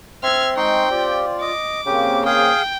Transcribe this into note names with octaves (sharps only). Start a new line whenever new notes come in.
C4 E5 C6 F6 G#6
G#3 D#4 G5 C6 C#6
F4 G4 D5
D#5 D6
C#3 A#3 C4 G4
G#4 F5 G5 D#6